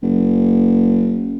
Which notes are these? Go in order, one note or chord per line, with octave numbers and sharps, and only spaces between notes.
F#1